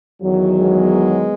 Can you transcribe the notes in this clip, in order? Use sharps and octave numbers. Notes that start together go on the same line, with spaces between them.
E2 D#3 F#3
G#3 B3